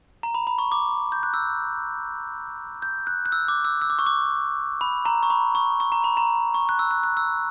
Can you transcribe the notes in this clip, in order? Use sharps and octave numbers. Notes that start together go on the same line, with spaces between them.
A#5
B5
B5
C#6
D6
G6
F#6
E6
G6
F#6
F#6
E6
D6
E6
E6
D6
C#6
D6
B5
A#5
C#6
B5
C#6
C#6
A#5
B5
A#5
C#6
F#6
E6
F#6
F#6
E6